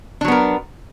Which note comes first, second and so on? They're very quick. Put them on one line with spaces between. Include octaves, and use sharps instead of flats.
D4 F#3 B3 A#4